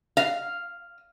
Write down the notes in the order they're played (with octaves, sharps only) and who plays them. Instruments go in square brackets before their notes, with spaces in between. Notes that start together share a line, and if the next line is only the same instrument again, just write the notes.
[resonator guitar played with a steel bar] F5